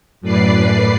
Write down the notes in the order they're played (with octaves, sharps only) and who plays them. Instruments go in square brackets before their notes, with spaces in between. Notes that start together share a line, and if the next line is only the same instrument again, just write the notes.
[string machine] F#2 A2 B4 D5 C7